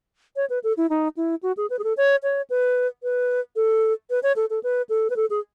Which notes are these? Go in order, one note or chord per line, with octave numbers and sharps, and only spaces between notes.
C#5
B4
A4
E4
D#4
E4
F#4
G#4
B4
G#4
A4
C#5
C#5
B4
B4
A4
B4
C#5
A4
A4
B4
A4
B4
A4
G#4